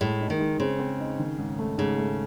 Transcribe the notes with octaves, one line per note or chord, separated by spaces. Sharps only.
A2 G#3
D#4
D#3
G#3
C#3 C4
C4
D#4
D#3
G#2
A3
G#2 C#3
A3